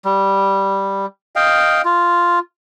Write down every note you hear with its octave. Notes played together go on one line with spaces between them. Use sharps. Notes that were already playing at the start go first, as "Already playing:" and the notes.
G3
D#5 F5 G5
F4